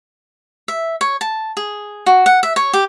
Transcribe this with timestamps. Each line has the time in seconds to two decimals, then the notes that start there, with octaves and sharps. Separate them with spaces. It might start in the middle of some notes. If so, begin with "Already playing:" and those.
0.68 E5
1.01 C#5
1.21 A5
1.57 G#4
2.06 F#4
2.26 F#5
2.43 E5
2.56 C#5
2.73 G4